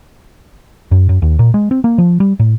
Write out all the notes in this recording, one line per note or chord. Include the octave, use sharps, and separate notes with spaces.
F#2
F#2
D#2
A#2
G#3
C4
A#3
F3
G3
A2